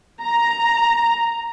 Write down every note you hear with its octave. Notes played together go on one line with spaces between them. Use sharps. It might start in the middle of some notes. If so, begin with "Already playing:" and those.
A#5